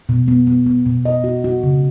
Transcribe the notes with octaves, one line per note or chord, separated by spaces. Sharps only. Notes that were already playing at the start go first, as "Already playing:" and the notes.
B2
B3
B3
B3
B2
D#5
F#4
F#4
C#3